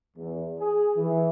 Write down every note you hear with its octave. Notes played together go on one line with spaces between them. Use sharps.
E2
G#4
E3